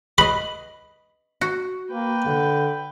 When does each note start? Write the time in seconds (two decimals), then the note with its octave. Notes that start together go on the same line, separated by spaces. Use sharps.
0.18 B4 D#5 B5
1.41 F#4
1.92 A#3 B4 G5
2.26 D3